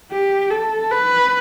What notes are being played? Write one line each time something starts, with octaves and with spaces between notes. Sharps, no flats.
G4
A4
B4